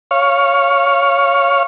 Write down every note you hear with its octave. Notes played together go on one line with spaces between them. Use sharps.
C#5 F5